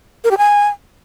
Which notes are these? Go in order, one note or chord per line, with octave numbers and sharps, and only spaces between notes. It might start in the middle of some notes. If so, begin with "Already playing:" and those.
A#4
G4
G#5